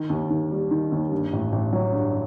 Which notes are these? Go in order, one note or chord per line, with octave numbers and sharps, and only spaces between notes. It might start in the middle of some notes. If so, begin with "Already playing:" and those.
Already playing: D#3
D#2
D#2
G3
D#3
D#2
G2
A1
A1
F#3
G2